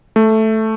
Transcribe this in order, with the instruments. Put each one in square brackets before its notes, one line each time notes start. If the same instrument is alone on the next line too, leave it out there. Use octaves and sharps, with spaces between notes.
[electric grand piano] A3